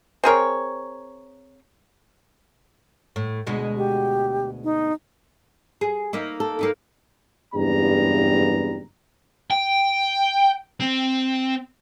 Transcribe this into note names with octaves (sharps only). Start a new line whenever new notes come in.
C4 G#4 A#4 C#5
A2
D2 B2 G#3
G4
D#4
G#4
A#3 D#4 E4
A4
A#3 D#4 E4
F#1 E2 G2 G3 B3 A#5
G5
C4